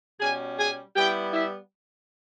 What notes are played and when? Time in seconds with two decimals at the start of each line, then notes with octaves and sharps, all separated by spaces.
0.20 B2 G3 C#4 G#4 G#5
0.58 G#4 G#5
0.96 G3 B3 E4 G4 G5
1.33 E4 E5